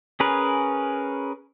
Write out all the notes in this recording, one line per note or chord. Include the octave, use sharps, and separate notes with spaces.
C#4 G#4 A#4 B4